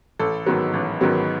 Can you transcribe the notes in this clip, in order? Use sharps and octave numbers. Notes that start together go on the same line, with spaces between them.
A1 A4
G#2 D#3 F#3 B3
A1
G#2 D#3 F#3 B3